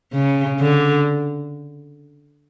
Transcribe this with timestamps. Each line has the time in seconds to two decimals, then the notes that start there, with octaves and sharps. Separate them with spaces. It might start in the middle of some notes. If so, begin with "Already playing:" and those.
0.13 C#3
0.60 D3